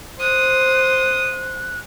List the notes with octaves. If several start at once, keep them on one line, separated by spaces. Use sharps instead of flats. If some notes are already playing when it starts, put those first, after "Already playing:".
C5 D#6 F#6